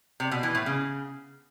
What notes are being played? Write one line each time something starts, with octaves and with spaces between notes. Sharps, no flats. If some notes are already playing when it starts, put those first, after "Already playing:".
C3
B2
E3
A2
C#3